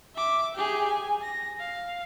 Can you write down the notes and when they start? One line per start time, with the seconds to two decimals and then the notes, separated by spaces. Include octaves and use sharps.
0.15 E5 D6
0.54 G4 G#4
0.88 G#5
1.23 A#6
1.59 F5